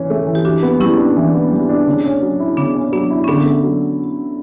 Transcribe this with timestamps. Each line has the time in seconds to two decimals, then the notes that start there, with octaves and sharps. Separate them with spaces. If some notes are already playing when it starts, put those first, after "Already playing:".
Already playing: E3 C#4
0.10 A3
0.27 E3
0.35 G4
0.44 E3 D4 F#4
0.63 B3
0.80 G3 C#4 E4
0.97 D4
1.16 E3
1.34 B3
1.51 G3
1.69 D4
1.87 C#3
2.05 C#4
2.22 F#3
2.40 E4
2.57 C#3 B3 D4
2.75 C#4
2.92 F#3 B3 D4
3.11 E4
3.24 C#4
3.28 D3 B3 D4
3.46 A3
3.63 F#3